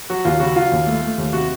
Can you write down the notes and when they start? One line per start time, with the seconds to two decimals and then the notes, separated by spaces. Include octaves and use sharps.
0.10 F#3 F#4
0.25 D#2 F4
0.40 C#3 F#4
0.55 F#3 F4
0.72 D#2
0.87 A3
1.02 A3
1.18 D#2
1.33 C3 F#4